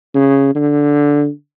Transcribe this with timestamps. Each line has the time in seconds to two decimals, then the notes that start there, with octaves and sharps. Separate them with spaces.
0.14 C#3
0.55 D3